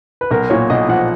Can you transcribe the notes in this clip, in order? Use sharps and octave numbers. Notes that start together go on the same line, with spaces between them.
B4
B1 A#4
A#2 C#5
B1 D#5
F3 F#5